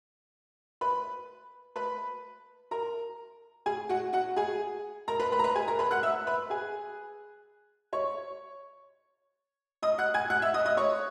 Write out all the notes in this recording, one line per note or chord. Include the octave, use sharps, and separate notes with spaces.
B4 B5
B4 B5
A#4 A#5
G#4 G#5
F#4 F#5
F#4 F#5
G#4 G#5
A#4 A#5
B4 B5
B4 B5
A#5
B4 B5
G#4 G#5
A#4 A#5
B4 B5
F#5 F#6
E5 E6
B4 B5
G#4 G#5
C#5 C#6
D#5 D#6
F#5 F#6
G#5 G#6
F#5 F#6
E5 E6
D#5 D#6
D#5 D#6
C#5 C#6